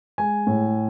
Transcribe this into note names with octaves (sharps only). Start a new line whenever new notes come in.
G#3 G#5
A2